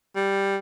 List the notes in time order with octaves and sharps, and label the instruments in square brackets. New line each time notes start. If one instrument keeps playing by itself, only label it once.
[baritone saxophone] G3